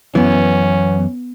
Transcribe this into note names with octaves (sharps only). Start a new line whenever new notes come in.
F#2 E3 B3 C#4